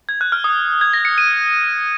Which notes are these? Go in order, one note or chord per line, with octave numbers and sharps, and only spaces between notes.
G#6
F#6
F6
D#6
G#6
A#6
C#7
D#7